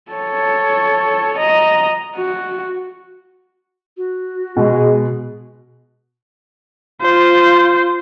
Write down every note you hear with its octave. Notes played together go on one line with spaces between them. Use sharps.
A4 C#5
D#5 A#5
F#4
F#4
B2 G#3
F4 C5